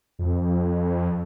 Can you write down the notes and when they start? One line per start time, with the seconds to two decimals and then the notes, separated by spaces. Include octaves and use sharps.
0.19 F2